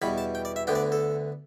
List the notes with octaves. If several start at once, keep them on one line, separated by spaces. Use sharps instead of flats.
E2 B2 G3 B5
A5
G5
D5
E5
D2 D3 B3 D4 G5
D5
A4